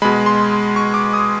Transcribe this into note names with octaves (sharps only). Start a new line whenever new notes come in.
B2 G#3 B5
C6
C#6
D6
D#6